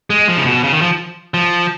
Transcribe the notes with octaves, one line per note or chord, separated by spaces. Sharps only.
G#3
F3
C#3
B2
C#3
D#3
F3
F3